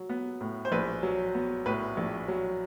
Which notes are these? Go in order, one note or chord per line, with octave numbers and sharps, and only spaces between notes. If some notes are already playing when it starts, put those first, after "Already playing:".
Already playing: F#3
B3
A2
C5
A#1 B4
F#3
B3
A2 B4
A#1
F#3